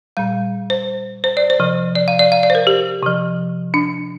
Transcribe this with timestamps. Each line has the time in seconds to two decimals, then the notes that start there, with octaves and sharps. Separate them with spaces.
0.17 A#2 G3 F5
0.70 C5
1.24 C5
1.37 D5
1.50 C5
1.60 C3 F3
1.95 D5
2.08 F5
2.19 D5
2.32 F5
2.43 D5
2.50 C5
2.55 A#4
2.67 G4
3.03 C3 F3
3.74 D4